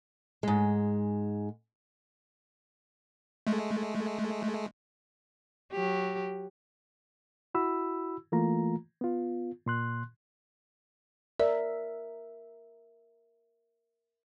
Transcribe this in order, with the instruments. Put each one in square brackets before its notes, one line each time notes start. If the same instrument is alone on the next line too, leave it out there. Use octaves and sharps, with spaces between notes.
[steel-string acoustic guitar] G#2 G#3
[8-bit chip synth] G#3 A3
[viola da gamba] F#3 G4
[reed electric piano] E4 F#4 B5 E6
E3 A3 A#3 F4 A#5
B3 F4
A#2 C6 F#6
[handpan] A#4 E5 [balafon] D5